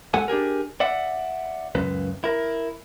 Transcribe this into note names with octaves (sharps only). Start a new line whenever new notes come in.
G#3 A4 F#5 G#5
D4 G4 G#4 A#4
D5 E5 F#5
C#2 F#2 C#3 B4
E4 A#4